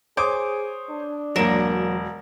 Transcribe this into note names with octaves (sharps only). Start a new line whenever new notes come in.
G#4 C5 C#5 D6 D#6
D4
E1 F#3 A#3 A#4 E7